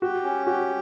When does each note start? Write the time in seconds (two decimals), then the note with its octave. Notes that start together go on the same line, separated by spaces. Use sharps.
0.02 F#4 G4
0.23 C#4
0.47 F#4 G4